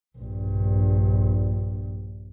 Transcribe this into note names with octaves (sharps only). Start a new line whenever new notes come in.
A#1 G2